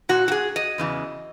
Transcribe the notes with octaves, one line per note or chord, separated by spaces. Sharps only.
A#2 F#4
F#4
G#4
D#5
E2 C#3 E3